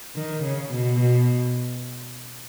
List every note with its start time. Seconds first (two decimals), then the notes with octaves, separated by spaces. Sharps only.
0.15 D#3
0.44 C#3
0.72 B2
1.00 B2